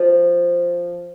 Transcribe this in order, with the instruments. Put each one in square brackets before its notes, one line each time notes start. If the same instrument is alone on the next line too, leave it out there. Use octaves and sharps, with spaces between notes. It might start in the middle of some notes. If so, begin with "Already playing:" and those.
Already playing: [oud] F3